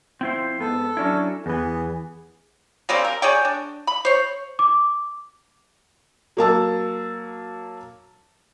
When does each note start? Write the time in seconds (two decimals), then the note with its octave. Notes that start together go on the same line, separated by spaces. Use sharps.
0.21 F3 C4 E4 C5
0.60 G#2 B3 A4
0.97 F#3 C#4 D4 E4
1.46 E2 E3 B3 G#4
2.89 C#3 G3 A#3 C4
3.05 A#4
3.22 G#4 C#5 D5 G5
3.45 D4
3.87 B5
4.05 C5 C#5
4.59 D6
6.37 F#3 A#3 A5 E6